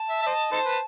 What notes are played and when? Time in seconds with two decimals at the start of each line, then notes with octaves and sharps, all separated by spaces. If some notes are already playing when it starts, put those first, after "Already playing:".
Already playing: A5
0.10 E5
0.22 E5
0.27 C5 D#5
0.52 D#4 A4 C5
0.65 B4